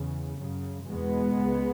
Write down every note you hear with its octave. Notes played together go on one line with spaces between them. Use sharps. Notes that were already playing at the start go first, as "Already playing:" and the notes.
Already playing: E2 C#3
F#2 C#3
E2 B2 G#3 B3
C#2 C#3